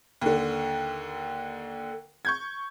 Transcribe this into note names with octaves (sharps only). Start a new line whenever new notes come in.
D#2 D3
C#6 G6 G#6